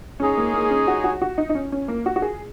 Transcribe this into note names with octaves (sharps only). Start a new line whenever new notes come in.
G#3 C#4 D#4 G#4 C#5
A#3
A#3
C#4
F#4
F#4
F#4
D#4
D#4
C#4
C#4
A#3
F#4
F#4
G#4